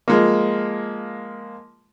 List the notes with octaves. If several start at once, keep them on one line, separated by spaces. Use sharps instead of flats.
F3 G#3 A#3